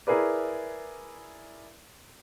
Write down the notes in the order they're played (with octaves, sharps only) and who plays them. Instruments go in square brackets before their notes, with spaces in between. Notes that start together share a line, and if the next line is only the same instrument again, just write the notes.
[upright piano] E4 G#4 A#4 B4 D5